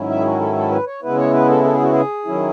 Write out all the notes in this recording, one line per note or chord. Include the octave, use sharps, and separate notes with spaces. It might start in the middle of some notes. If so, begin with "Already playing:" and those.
Already playing: G#2 D#3 F#3 C#4 E4
E5
G#4
F#4
A4
A4
B4
C#5
C#3 G#3 B3 E4 B4
C#5
B4
A4
A4
G#4
F#4
G#4
D#3 F#3 C#4 E4